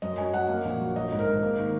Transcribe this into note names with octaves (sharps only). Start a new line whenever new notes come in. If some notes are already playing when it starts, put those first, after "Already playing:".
F#2 D#5
F#3 G#5
F#3 F#5
A#3
A#1
F#3
F#3 D#5
G#2
A#4
G#2
A#3
D#3